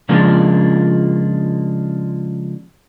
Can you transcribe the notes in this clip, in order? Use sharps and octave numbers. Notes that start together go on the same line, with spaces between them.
C#3 F3 G#3 A#3 D4 F4